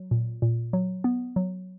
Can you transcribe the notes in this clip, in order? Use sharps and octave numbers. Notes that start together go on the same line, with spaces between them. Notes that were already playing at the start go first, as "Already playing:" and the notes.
Already playing: F#3
A#2
A#2
F#3
B3
F#3